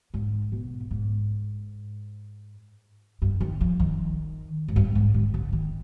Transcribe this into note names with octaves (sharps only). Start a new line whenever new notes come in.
G#2
B2
G#2
G2
D#3
F3
D#3
G#2
G2
G#2
D3
D3
D#3